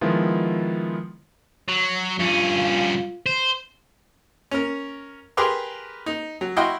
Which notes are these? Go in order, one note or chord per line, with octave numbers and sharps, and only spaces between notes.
D#3 F3 G#3 B3 E4 F4
F#3
G2 C#4 F4
C5
C#4 A#4
G4 G#4 A#4 B4 C6 D6
D#4
F#3
E4 F#4 D#5 F5 G5 C6